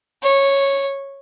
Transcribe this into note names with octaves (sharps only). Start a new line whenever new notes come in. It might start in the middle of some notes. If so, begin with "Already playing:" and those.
C#5